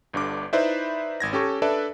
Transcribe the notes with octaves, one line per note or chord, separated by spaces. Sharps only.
G1 G2 D3 D6
D#4 E4 B4 C5 D5 E5
G#1 G#6 A#6
C#4 G4 A4 C#6
D4 A4 B4 D5 E5